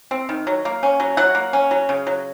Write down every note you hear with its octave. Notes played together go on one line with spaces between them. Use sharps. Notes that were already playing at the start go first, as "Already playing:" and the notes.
C4
D#3
F#3
A#3
C#4
F#3
F#3 F#5
A#3
C#4
F#3
C#3
F#3